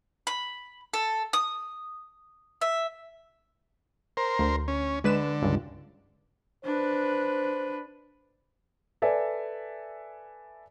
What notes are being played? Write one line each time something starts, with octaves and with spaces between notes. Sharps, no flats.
B5
A4
D#6
E5
A#4 C5
D2
C#4
D3 G#3 B4 E7
C#2 G2
D4 B4 C5
A4 B4 D5 E5 G#5